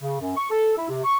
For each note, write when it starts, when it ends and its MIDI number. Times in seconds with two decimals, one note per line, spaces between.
0.01 0.17 49
0.20 0.35 42
0.37 0.49 85
0.50 0.72 69
0.77 0.87 64
0.89 1.03 48
1.04 1.18 85